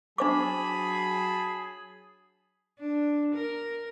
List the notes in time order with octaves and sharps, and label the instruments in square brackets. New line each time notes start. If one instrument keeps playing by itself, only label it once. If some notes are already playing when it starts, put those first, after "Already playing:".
[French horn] F#3 [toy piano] D4 C5 D6 [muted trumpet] G#4 [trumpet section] A5 B5
[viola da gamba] D4
A#4